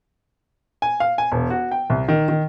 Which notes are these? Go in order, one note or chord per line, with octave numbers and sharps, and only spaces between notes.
G#5
F5
G#5
E1
F#4
G5
C2
D#3
D#3